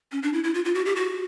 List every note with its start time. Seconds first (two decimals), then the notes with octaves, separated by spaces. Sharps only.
0.12 C#4
0.23 D4
0.33 E4
0.44 E4
0.54 F4
0.65 F4
0.75 F#4
0.86 G4
0.96 F#4